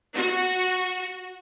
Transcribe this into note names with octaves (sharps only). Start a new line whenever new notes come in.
F#4